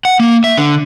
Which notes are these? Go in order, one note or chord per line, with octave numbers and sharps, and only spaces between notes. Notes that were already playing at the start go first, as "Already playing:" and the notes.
F#5
A#3
E5
D3